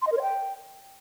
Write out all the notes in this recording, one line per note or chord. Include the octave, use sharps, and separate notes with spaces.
C6
D#5
A#4
C#5
G5